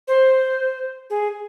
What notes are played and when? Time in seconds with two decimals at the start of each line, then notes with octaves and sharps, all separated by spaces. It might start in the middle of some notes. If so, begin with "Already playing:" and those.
0.08 C5
1.10 G#4